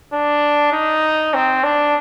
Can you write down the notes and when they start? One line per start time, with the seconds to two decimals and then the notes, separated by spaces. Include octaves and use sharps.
0.13 D4
0.73 D#4
1.34 C4
1.64 D4